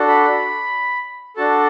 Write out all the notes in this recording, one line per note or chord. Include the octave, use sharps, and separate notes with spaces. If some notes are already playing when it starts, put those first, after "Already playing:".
Already playing: D4 F#4 A4
B5
D4 F#4 A4 A5